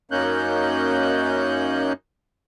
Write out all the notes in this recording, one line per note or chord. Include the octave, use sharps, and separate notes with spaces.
F#2 A#3 C#4 D#4 F#6 G6